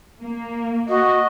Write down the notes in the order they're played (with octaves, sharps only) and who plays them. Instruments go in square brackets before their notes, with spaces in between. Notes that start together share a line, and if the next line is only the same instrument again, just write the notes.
[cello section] A#3
[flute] F#4 [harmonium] D#5